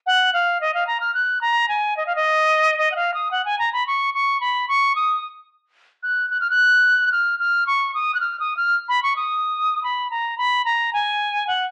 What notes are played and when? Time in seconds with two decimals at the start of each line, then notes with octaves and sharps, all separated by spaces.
0.06 F#5
0.33 F5
0.61 D#5
0.74 F5
0.87 A#5
1.01 F6
1.14 F#6
1.41 A#5
1.69 G#5
1.97 D#5
2.07 F5
2.16 D#5
2.78 D#5
2.92 F#5
2.96 F5
3.14 D#6
3.31 F#5
3.45 G#5
3.59 A#5
3.73 B5
3.87 C#6
4.14 C#6
4.41 B5
4.68 C#6
4.96 D#6
6.03 F#6
6.30 F#6
6.41 F6
6.50 F#6
7.12 F6
7.40 F6
7.67 C#6
7.94 D#6
8.15 F#6
8.21 F6
8.40 D#6
8.57 F6
8.89 B5
9.03 C#6
9.16 D#6
9.84 B5
10.11 A#5
10.38 B5
10.65 A#5
10.93 G#5
11.47 F#5